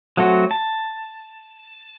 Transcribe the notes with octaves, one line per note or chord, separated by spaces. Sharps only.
F#3 A3 C4 F#4
A5